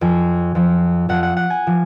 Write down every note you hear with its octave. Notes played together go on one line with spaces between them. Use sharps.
F2 F3 G#5
F2 F3
F2 F3 F#5
F#5
F#5
G#5
F3